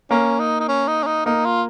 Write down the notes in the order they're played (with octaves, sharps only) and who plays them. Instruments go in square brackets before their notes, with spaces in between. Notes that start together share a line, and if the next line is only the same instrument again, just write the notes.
[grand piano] A#3 [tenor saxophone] C#4
[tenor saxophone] D#4
D#4
C#4
D#4
C#4
D#4
[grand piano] A#3 [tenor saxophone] D#4
[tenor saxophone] F4